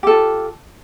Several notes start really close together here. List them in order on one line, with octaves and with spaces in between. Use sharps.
G4 A4 F4